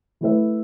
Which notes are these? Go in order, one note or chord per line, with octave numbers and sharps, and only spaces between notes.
E3 A3 E4 B4 E5